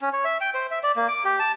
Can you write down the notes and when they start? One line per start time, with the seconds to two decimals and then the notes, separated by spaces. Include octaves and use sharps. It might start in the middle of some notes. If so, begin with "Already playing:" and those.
0.01 C#4
0.13 C#5
0.25 E5
0.41 G5
0.54 C5
0.71 E5
0.83 D5
0.96 A#3
1.08 D6
1.25 G4
1.39 A5